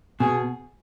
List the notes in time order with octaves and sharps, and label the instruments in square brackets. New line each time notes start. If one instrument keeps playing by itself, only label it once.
[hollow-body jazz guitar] B2 [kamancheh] G#4